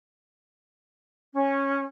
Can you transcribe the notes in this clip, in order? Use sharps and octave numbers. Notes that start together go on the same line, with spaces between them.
C#4